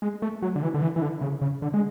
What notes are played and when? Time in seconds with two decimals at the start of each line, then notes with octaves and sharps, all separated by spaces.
0.02 G#3
0.22 A3
0.42 F#3
0.56 D3
0.63 E3
0.74 D3
0.82 E3
0.96 E3
1.02 D3
1.22 C#3
1.42 C#3
1.62 D3
1.74 G#3